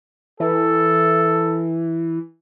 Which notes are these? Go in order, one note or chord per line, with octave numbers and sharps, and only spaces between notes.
E3 A4